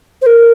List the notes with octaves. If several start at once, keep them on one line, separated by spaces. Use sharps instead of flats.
C5
A#4